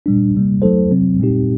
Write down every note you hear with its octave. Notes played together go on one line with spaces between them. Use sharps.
A#2 G3 D4
C3 G3 A#3
F#3 A3 D#4 A4 C5
C3 F#3 C4
A#2 G3 C4 D#4 G4